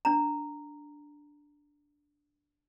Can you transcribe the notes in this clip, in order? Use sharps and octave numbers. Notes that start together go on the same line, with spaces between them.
D4 A#5